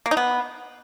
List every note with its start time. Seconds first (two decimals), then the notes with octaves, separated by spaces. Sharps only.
0.06 A#3
0.11 D#4
0.17 B3